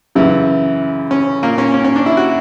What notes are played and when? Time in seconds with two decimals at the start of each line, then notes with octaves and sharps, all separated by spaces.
0.15 F#2 C#3 E3 E4
1.11 C#4
1.43 A#2 A#3
1.58 C#4
1.74 C#4
1.84 C#4
1.96 D4
2.06 E4
2.17 F#4